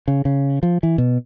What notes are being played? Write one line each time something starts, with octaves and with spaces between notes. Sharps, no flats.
C#3
C#3
F3
E3
B2